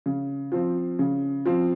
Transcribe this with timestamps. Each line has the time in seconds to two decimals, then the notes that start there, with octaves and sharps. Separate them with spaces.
0.06 C#3
0.52 F3 C4
0.99 C#3
1.46 F3 C4